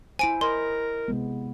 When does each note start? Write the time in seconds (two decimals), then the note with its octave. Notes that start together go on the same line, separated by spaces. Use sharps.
0.19 E4 C5 G#5 D7
0.41 A#4 D#5 C6
1.08 C3 G#3 B3